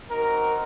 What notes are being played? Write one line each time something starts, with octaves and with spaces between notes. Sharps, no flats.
C4 D#4 F#4 A#4